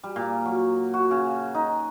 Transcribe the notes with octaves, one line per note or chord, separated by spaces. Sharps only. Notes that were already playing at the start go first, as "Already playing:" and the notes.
G3
A#2
F#3
F#4
C#3
D#4